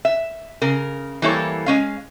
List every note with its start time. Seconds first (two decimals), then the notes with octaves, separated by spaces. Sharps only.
0.05 E5
0.62 C#3 A#4
1.22 E3 G3 A#3 E4 A4 C#5
1.66 G#3 C#4 F5